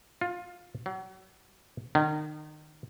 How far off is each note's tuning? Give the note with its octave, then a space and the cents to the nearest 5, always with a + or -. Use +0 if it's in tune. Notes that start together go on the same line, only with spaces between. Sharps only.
F4 +20
F#3 +35
D#3 -30